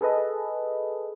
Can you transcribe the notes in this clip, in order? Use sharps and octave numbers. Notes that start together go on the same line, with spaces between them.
G#4 A4 B4 D#5